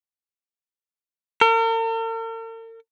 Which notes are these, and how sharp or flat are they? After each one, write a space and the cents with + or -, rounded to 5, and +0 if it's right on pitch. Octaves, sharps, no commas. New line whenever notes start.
A#4 -45